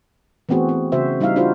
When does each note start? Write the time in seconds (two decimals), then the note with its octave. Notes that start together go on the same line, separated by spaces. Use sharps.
0.49 E3 A3 B3 C4 F#4 G#4
0.69 C4
0.92 C#3 F#4 C5 E5
1.20 G3 D#4 E4 E5 F5
1.36 D4 D#4 F4 F#4 C5